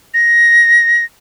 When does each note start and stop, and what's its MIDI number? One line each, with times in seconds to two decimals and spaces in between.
0.14 1.04 94